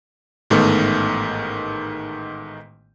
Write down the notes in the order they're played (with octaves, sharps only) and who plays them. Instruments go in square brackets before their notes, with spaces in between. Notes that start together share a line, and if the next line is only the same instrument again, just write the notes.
[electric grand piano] A1 G#2 D#3 A3 B3